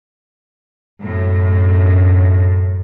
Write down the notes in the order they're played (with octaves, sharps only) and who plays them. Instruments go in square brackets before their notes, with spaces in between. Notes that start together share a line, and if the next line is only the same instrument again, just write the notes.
[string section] F#2 A2